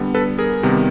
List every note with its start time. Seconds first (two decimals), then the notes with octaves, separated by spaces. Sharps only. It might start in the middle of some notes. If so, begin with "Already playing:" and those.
Already playing: D3 G3 B3
0.14 A4 B4
0.38 G#4 A#4
0.63 C3 D#3 G3 B3